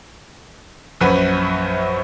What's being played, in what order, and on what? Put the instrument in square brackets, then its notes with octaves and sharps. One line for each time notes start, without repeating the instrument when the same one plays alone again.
[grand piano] A#1 F#2 B4 F#5